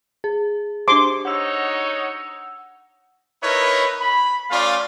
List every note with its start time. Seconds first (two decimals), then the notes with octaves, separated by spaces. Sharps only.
0.24 G#4
0.88 D4 G4 C5 C6 D6
1.25 D#4 F#4 C#5 F#5 E6
3.43 D#4 E4 A#4 B4 C#5
4.00 B5
4.51 A3 C#4 F4 D5 F5